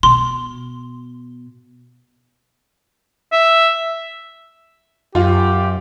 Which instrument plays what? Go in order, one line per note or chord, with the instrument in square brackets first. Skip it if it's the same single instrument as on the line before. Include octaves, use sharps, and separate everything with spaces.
[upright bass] B2 [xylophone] C6
[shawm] E5
[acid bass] F#2 [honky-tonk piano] F4 [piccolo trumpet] G4